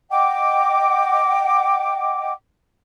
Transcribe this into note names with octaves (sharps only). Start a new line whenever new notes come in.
D#5 F#5 G5 D6